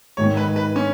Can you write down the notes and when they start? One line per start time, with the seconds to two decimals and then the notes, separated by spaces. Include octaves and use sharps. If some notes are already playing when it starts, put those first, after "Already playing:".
0.17 G#2 D#3 G#3 C#5
0.37 B4
0.56 B4
0.76 C#4